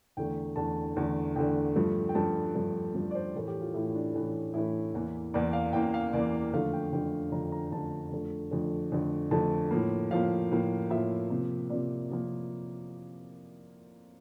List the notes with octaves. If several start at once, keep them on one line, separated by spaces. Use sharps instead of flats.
E2 D3 A3 G5
E2 D3 A3 A5
E2 D3 A3
E2 D3 A3 G5
G2 F3 A3
G5
G2 F3 A3 A5
G2 F3 A3
G2 F3 A3
D5
C5
A2 E3 A3 A#4
G4
F4
A2 E3 A3 E4
D4
A2 E3 A3
A2 E3 A3 E4
E2 E3 A#3
E2 E3 A#3 D5
F5
E2 E3 A#3 G5
F5
E2 E3 A#3 D5
F2 D3 A3 F5
G5
F2 D3 A3 G5
F2 D3 A3 A#5
A#5
F2 D3 A3 A5
F2 D3 A3
F2 D3 A3
F2 D3 A3
F2 D3 A3 A5
A2 F3 A#3
A2 F3 A#3 F5
A2 F3 A#3
A2 F3 A#3 E5
C3 F3 A#3
C3 F3 A#3 D5
C3 F3 A#3